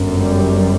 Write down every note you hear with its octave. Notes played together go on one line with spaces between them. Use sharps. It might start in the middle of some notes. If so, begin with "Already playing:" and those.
Already playing: G1 F#2
G3